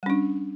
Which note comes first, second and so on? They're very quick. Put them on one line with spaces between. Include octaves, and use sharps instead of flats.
G3 C#4 D4